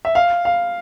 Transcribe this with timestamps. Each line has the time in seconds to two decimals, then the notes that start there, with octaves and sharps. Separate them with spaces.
0.05 E5
0.15 F5
0.45 F5